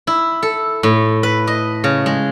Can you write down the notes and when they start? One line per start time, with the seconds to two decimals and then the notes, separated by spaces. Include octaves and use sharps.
0.07 E4
0.43 A4
0.83 A2
1.23 B4
1.47 D#5
1.84 C#3
2.06 G#3